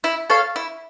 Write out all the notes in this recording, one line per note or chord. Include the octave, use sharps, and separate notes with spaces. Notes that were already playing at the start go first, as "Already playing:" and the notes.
E4
A4 C#5 F5
E4